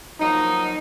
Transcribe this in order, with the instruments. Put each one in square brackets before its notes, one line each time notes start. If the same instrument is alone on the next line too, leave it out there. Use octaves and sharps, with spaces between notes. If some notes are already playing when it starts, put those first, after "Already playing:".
[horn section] F3 F#3 A#3 D#4